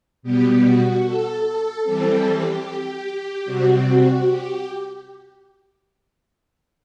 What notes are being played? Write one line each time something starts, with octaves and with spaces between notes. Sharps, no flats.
B2 G3 B3 G4
F#4
A4
A4
E3 G3 C4 A4
G4
C3 G3 C4 F#4
G4